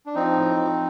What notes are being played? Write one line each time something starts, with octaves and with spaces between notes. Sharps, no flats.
D4
F3 C4 D#4
A2
F3